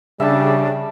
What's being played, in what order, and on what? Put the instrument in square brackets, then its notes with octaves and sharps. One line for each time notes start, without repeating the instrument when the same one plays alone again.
[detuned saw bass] C#3 [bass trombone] G3 [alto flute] D4 [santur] E5 A5